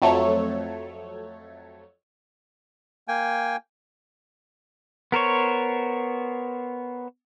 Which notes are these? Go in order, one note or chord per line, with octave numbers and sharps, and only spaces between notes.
F2 F#3 A3 A4 C#5
A#3 G5 G#5
B3 A#4 C5 C#5